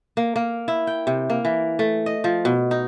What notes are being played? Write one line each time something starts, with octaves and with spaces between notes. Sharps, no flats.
A#3
A#3
E4
G5
C3
A#3
E3
A3
D#5
F3
B2
D#4